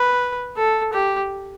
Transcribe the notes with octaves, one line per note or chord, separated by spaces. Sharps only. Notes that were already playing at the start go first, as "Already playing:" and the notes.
Already playing: B4
A4
G4